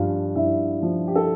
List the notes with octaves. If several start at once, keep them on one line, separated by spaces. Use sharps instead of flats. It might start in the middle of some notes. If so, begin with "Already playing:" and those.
Already playing: G2 F3 F4 F5
G2 E4 E5
F3
G4
A4